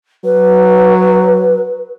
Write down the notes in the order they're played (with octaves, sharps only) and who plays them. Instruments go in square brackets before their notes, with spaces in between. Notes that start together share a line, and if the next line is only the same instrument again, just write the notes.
[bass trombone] F#3 [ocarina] B4